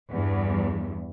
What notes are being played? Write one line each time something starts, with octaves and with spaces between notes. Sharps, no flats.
E2 G2